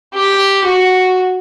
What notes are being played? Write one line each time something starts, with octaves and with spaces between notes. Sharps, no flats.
G4
F#4